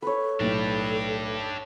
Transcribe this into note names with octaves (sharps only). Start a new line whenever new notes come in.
A4 B4 C#5
B1 A2 D4 G4